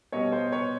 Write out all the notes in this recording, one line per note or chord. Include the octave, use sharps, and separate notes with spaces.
B2 G3 B3 C#5 D#5
C5
B4 C#5